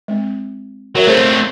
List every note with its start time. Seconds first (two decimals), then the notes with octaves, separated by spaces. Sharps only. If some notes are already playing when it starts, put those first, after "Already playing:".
0.08 G#3 C4
0.95 F#3 A#4 C#5 E5
1.07 A3 C4 G#4 C5 C#5